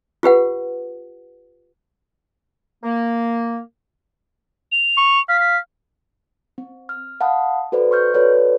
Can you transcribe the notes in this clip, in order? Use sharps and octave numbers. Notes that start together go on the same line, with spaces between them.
F4 G4 B4 F#5
A#3
F7
C#6
F5 B6
B6
C4
F6
F5 F#5 A5 B5 D#6
F#4 A4 B4 C5 D5
C6 C#6 F6 G6
F#4 A4 B4 C#5 D5